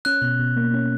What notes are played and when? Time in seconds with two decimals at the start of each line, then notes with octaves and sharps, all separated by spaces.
0.05 C#4 F#6
0.22 B2
0.40 B2
0.57 A#3
0.74 C#4